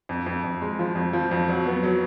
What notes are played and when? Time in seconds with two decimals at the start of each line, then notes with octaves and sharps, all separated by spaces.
0.09 F2
0.26 F2
0.44 F2
0.62 G#3
0.79 F3
0.95 F2
1.13 F3
1.31 F2
1.48 F#3
1.66 B3
1.83 F#3